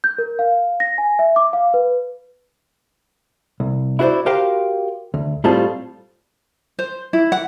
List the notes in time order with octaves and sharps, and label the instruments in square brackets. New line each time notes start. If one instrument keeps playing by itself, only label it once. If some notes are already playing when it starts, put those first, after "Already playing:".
[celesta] G6
A#4
F5
A#6
G#5
E5
D6
F5
B4
[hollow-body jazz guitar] C2
E4 F#4 G#4 C5 D5
F#4 G4 A#4 C5 F5 G5
D2
A2 G3 C4 F4 G#4 A5
[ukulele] C5
E4
F#5